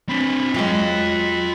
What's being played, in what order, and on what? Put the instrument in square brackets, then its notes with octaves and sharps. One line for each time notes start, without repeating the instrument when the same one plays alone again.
[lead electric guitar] C4 D4 [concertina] B5
[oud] F#3 G#3 [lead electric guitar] F4 G5